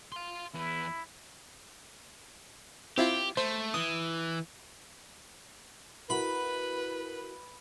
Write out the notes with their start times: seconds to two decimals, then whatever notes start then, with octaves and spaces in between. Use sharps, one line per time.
0.12 F5 C6
0.54 E2 E4 B4
2.98 C4 E4 F4 G4
3.37 A3 C5
3.74 E3 D#6
6.10 E4 F#4 A#4 B4 B5